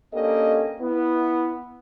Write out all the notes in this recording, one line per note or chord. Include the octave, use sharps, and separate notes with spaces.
A#3 C#4 D4 G4 A4 D#5
B3 E4